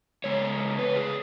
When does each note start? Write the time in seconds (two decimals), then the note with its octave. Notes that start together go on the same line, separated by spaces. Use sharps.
0.24 C#3 G#3 B3 C#5
0.79 B4
0.96 G#4